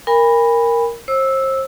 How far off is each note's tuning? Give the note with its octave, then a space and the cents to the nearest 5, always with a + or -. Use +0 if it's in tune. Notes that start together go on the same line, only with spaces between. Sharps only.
A#4 +0 G#5 -40 B5 +0
C5 +35 E6 -5